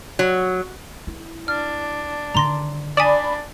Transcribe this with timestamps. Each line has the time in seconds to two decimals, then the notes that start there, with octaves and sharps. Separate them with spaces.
0.19 F#3
1.07 E4
1.48 D4 F6
2.35 D3 D#3 A#5 C6 A#6
2.97 D4 D5 G#5 B5 D#6 E7